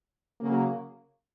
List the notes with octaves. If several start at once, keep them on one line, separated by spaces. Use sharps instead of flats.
C#3 F#3 A#3